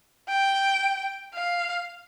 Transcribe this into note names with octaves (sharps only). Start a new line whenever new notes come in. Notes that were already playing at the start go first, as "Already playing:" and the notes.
G5
F5